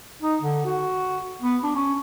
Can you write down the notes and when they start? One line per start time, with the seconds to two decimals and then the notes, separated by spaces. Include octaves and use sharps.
0.22 D#4
0.41 D3
0.65 F#4
1.42 B3
1.63 D4
1.75 C#4